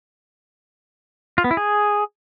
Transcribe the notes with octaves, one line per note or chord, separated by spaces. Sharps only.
F4
B3
E4
G#4